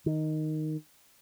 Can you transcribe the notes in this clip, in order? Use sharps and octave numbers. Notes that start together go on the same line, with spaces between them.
D#3